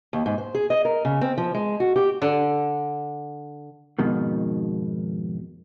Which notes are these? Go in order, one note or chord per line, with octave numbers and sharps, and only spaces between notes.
D#2
G#2
C5
G#4
D#5
A#4
C#3
C4
F3
G#3
F#4
G4
D3
F2 G#2 B2 D#3